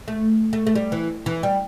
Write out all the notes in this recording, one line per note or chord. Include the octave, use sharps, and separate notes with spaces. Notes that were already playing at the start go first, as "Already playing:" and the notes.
A3
A3
A3
G3
E3
E3
G3